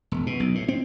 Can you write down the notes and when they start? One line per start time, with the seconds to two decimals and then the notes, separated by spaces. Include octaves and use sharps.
0.12 E1
0.27 B2
0.40 B1
0.55 A2
0.68 C4